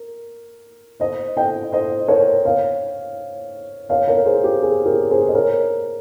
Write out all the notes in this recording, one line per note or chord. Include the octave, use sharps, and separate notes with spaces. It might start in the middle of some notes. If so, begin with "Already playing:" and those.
Already playing: A#4
C5 D#5
D#5 G5
C5 D#5
A#4 C#5
C#5 F5
C#5 F5
A#4 C#5
G#4 C5
G4
G#4
G4 A#4
G#4 C5
D#5
A#4 C#5